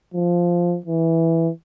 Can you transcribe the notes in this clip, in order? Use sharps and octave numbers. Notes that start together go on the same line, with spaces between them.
F3
E3